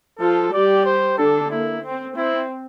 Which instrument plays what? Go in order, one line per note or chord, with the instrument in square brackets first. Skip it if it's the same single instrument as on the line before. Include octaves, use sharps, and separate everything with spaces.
[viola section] F3 F4 [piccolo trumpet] A4
[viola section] G3 G4 [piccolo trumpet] D5
[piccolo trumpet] C5
[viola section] D3 D4 [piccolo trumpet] A4
[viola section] A#3 [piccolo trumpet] E4
[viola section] C4
[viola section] C4 [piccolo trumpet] E4